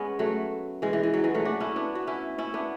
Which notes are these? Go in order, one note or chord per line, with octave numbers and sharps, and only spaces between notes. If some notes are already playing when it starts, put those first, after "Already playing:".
Already playing: G#3 B3 C#4
F#3 A3
E3 G#3
E3
E3
F#3
E3 G#3
F#3 A3
D4 F#4
C#4 E4
B3 D4
F#4
C#4 E4
C#4 E4
B3 D4